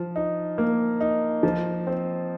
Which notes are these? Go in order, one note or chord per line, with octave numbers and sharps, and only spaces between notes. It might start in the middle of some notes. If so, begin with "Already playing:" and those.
Already playing: F3
D#4
A#3
D#4
F3
C4